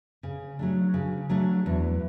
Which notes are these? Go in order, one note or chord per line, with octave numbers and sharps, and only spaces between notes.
C#3
F#3 A3 D4
C#3
F#3 A3 D4
E2